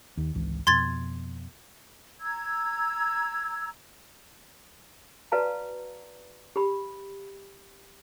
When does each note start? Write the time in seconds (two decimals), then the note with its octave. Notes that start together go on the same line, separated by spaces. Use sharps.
0.17 D#2
0.35 G#1 C#2 E3
0.67 F2 B2 C6 G#6 A6
2.21 A#5 E6 G#6
5.32 F#4 B4 D5 F5 A5 A#5
6.56 G4 B5